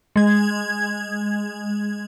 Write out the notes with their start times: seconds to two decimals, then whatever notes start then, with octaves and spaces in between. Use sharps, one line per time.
0.16 G#3 G#6